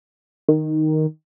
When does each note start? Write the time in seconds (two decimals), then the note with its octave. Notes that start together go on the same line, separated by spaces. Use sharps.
0.48 D#3